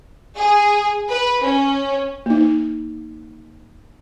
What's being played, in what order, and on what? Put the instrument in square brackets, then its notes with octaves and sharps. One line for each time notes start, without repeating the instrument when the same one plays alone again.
[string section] G#4
B4
C#4
[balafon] A#3 D#4